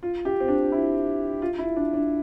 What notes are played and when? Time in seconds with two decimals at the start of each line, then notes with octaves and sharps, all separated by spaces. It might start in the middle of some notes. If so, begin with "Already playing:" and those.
0.03 F4
0.25 G4
0.40 C4
0.48 D4
0.72 E4
1.42 F4
1.58 E4
1.76 D4
1.94 D4